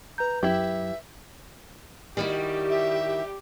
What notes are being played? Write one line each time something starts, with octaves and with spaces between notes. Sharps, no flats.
B4 A#5 G6
F#2 E4 G4 E5
D#3 G3 E4 F#4 G4
E5